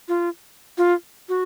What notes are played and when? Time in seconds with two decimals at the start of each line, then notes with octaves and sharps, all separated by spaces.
0.08 F4
0.78 F4
1.29 F#4